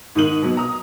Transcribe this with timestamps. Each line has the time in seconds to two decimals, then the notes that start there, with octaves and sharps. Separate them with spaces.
0.15 G#2 D#3 D#7 F#7
0.42 B2 F#3
0.57 A#5 D#6